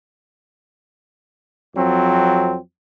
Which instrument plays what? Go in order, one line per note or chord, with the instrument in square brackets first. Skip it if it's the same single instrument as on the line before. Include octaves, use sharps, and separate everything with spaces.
[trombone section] F2 F#3 C4